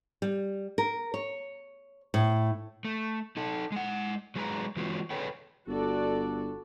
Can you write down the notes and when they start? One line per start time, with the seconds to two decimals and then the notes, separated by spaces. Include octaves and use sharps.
0.22 G3
0.78 A#4
1.14 C#5
2.14 A2
2.85 A3
3.37 D#4 A4
3.72 G#3 F#5
4.36 F#3 G#3 G#4 B4 A5 A#5
4.77 E3 F#3 G#3 C4 F4 F#4
5.10 G#4 A4 B4 C#5 G5
5.68 G1 F#4 A4 D5